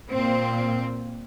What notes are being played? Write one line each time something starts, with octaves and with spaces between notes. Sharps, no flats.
A#2 C4